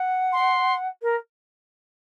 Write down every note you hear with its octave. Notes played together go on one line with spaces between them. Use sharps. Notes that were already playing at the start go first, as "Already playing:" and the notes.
Already playing: F#5
C6
A#4